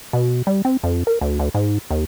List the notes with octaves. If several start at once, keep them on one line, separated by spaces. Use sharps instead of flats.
B2
G3
C4
F2
A#4
D2
D2
G#2
D#2